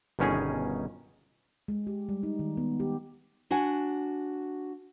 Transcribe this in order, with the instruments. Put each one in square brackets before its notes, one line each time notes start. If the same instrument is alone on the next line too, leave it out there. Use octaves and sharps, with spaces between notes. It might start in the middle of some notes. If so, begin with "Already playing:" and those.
[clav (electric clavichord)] G1 B2 D#3 C#4 D#4 G#4
[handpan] G#3
G4
G3
D#4
D#3
B3
G4
[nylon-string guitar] D4 F#4 F#5 G#5